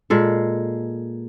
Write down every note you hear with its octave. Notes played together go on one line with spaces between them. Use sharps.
A#2 G#3 A4